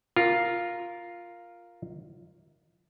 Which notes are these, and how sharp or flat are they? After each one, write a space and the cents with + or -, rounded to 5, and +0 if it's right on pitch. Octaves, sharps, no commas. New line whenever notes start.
F4 +0 A#4 +0